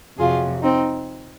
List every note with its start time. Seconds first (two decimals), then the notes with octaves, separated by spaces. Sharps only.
0.18 F2 C3 F#3 F4 G#4
0.62 C4 D#4